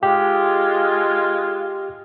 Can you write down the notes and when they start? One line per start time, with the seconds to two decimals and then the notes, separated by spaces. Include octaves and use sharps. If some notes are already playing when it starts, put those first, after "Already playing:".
0.03 G#3 F4 G4